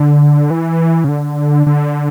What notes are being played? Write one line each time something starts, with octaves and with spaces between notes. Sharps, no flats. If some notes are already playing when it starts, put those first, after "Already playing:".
Already playing: D3
E3
C#3
D3
D3